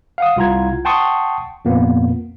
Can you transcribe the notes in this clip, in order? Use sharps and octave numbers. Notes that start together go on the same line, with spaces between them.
F5 F#5 D#6
C2 E4 F4 F#5 A#5 G#6
F#5 G5 A5 C6 C#6 D#6
F2 A#2 A#3 B3